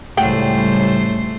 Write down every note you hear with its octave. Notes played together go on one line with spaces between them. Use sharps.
C#2 A2 C#3 G3 A3 C5 F#5 G5